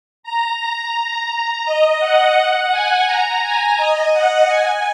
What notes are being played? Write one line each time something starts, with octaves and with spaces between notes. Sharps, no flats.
A#5
A#5
A#5
D#5
F#5
G#5
A#5
G#5
D#5
F#5
G#5